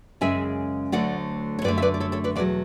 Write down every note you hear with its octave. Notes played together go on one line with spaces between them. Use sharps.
F#2 C#3 G#3 E5 G#5
D2 D3 F#3 A3 D5 F#5
C#5
F#2 D3 A3 B4 D5
E5
B4 D5
D5
A4 C#5
A4 C#5
B4 D5
E2 B2 F#3 B4 D5